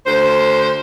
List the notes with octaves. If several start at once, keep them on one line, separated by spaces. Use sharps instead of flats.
D2 C5